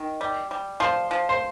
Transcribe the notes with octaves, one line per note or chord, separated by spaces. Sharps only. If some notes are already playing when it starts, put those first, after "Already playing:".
Already playing: D#3
G3
G3
F3 C5
F3
C5